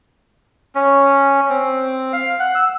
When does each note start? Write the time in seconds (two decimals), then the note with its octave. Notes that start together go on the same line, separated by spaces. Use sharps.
0.75 C#4
1.50 C4
2.13 F5
2.39 F#5
2.55 E6